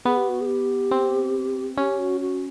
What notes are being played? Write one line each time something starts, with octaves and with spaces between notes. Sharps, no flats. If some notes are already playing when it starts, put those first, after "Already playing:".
B3 G#4
G4
F#4
G#4
G4
C4
C#4 G4
F#4
F#4